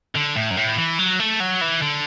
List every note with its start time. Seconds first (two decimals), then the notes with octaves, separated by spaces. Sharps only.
0.15 D3
0.36 A2
0.51 F#2
0.57 A2
0.77 E3
0.99 F#3
1.19 A3
1.40 F#3
1.61 E3
1.82 D3